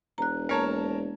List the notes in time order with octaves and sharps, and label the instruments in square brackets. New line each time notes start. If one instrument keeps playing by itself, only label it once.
[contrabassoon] E1 [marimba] A#5 F#6
[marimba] G#3 A#3 [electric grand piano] A#4 C#5 A5